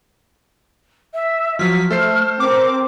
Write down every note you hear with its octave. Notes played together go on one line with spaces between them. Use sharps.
E5
F3 F#3 F6 B6
A3 A4 C5 C7
C4 A#4 D6